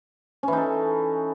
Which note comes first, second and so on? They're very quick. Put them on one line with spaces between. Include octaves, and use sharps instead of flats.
C#4 E3 D#4 A4